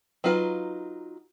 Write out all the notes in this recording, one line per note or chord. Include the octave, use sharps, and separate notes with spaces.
F#3 D#4 F4 B4